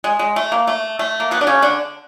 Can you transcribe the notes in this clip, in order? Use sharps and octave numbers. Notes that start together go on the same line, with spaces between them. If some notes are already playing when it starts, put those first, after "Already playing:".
G#3
G#3
A3
A#3
A3
A3
A#3
B2 B3
D4
C#3 C#4
D3 D4